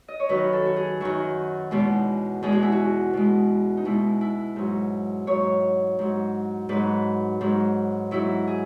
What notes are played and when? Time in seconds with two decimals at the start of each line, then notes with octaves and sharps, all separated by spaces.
0.08 D#5
0.20 C#5
0.29 F#2 D#3 F#3 B4
0.53 A4
0.66 F#4
0.76 G#4
1.00 F#2 D#3 F#3 F#4
1.71 E2 B2 G#3
2.42 E2 B2 G#3 G#4
2.52 F#4
2.63 E4
2.72 F#4
3.13 B2 G#3
3.77 D#4
3.85 B2 G#3 E4
4.21 E4
4.56 G#2 F#3
5.27 G#2 F#3 C#5
5.99 G#2 F#3
6.69 G#2 F#3 B4
7.41 G#2 F#3
8.11 G#2 F#3 E4
8.47 G#4